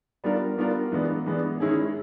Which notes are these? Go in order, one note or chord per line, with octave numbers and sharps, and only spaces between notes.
G3 B3 D4 F4 A#4
G3 B3 D4 F4 A#4
E3 G#3 B3 D4
E3 G#3 B3 D4
D#3 G#3 C#4 E4 G#4